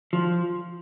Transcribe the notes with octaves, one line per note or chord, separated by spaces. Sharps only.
F3